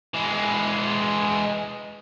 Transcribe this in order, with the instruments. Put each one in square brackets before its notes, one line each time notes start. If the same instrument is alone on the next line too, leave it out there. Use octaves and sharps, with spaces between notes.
[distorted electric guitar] E3 G#3